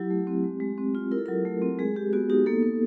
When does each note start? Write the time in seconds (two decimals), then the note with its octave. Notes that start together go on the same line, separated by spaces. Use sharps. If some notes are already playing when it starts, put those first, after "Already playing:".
Already playing: F#3 E4 G4
0.10 A3
0.27 C4
0.44 G#3
0.60 G#3
0.78 C4
0.95 F4
1.12 E4 A#4
1.18 A4
1.26 F#3 A#4
1.45 A3
1.62 C4
1.79 G#3 G#4
1.96 G#3 G4
2.13 B3 F#4
2.30 D#4 G4
2.46 A#3 A4
2.63 A#3